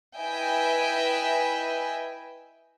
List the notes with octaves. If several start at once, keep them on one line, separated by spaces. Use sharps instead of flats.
E4 B4 D#5 E5 G5 G#5